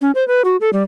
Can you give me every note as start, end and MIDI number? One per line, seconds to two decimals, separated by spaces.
0.01 0.11 61
0.15 0.26 72
0.28 0.42 71
0.45 0.57 66
0.61 0.70 69
0.73 0.83 55